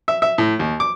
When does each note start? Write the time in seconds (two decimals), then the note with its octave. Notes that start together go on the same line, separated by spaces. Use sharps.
0.08 E5
0.22 E5
0.38 A2
0.59 D#2
0.80 D6